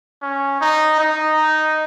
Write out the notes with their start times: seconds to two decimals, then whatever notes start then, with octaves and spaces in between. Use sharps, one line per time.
0.22 C#4
0.61 D#4
1.00 D#4